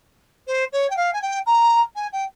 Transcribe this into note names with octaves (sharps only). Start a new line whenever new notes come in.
C5
C#5
G5
F5
G#5
G5
A#5
G#5
G5